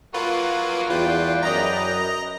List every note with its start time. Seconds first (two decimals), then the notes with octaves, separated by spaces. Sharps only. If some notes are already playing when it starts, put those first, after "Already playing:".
0.14 F#3 A#3 F4 B4 C#6
0.90 E2 F4 B4 D5 G5
1.43 F#2 D#5 A#5